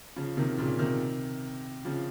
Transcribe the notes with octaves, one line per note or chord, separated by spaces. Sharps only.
C#3 F3
C3 D#3
A#2 C#3
C3 D#3
C#3 F3